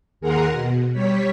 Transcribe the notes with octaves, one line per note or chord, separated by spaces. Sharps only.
D#2 G#4 A#4 F#5 A#5 C6
B2
G3 C#5 B6